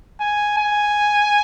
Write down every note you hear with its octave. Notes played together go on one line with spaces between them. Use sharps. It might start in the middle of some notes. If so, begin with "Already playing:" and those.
G#5
G#5